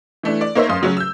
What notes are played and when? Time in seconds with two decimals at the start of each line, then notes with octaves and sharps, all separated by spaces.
0.23 E3 A3 D4
0.41 D5
0.55 A#3 D#4 C5 C#5 E5
0.69 F#2 F5 C6 D#6
0.81 C#3 F#3 C#4
0.97 E6 G6